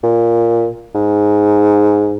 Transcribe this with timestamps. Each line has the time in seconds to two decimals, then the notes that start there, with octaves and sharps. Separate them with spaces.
0.03 A#2
0.95 G#2